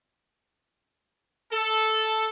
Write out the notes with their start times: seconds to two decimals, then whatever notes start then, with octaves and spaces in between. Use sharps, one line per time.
1.52 A4